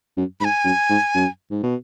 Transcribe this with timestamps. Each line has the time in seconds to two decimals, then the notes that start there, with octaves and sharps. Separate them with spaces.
0.17 F#2
0.40 G#2 B5
0.45 G#5
0.64 F#2
0.89 G#2
1.14 F#2
1.51 G#2
1.63 B2